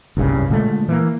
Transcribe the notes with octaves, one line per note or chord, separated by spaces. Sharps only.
F#1 C2 G2 C#3
A#2 D3 G#3 A3
E3 A#3